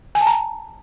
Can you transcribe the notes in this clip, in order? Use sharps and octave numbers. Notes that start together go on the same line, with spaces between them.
G#5
A5
A#5